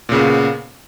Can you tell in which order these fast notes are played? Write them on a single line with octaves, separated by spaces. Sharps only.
A#2 C#3 B3